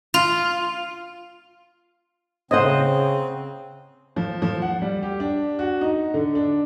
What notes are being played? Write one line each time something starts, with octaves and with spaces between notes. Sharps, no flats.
F4
C#3 C4 C5 C#5 D#5 F#5
F3
F3
F#5
G3
G4
D4
F#4
D#4
D3
D4